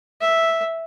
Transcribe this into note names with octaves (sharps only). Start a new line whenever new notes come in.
E5